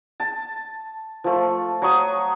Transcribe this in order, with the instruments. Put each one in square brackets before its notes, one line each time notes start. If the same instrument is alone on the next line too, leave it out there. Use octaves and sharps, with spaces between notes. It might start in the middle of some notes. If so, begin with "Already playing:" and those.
[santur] A5
F3 A3
F#3 C#6 D#6